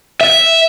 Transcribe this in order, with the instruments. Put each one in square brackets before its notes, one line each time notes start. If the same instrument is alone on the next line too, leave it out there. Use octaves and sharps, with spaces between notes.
[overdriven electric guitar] E5